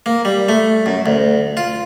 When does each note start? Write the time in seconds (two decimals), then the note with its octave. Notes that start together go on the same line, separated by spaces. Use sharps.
0.06 A#3
0.25 G3
0.49 A3
0.86 F#2
1.06 D2
1.57 F4